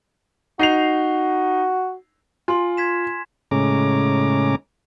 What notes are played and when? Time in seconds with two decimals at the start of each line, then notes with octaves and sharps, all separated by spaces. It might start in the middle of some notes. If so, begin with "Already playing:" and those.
0.59 D#4 F#4 C7 F7
2.48 F4 G#5 C6
2.77 G#6 B6 E7
3.51 A2 C#3 G#3 C#4 A#5 D6